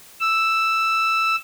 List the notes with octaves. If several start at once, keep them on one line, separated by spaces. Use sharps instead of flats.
E6